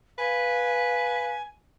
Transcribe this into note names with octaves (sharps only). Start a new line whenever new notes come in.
B4 F5 G#5